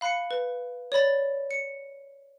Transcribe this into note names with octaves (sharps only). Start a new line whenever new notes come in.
F5 B5 F#6 C7 C#7
B4
C#5 D5 B5 A6
C#7